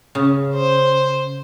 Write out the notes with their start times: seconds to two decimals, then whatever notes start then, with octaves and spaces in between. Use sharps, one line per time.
0.15 C#3
0.54 C5